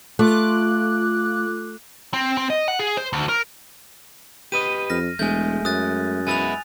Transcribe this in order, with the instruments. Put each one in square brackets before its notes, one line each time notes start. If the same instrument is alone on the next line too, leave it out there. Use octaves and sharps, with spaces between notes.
[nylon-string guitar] A3 [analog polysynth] F4 D6 F#6
[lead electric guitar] C4
C4
D#5
F#5
G#4
C5
D2
A#4
[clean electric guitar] G4 B4 D#5 [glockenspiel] D#7
[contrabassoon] F2 [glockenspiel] F6 A#6
[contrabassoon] E1 [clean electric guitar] G#3 A3 [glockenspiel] G#5 G6
[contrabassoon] F#2 [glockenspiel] D#6 F#6 A6
[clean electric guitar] G#3 B3 E4 [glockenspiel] G#5 A6 F7